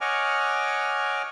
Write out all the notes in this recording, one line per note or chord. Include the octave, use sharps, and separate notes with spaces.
C#5 D#5 F#5 G#5 D6 F6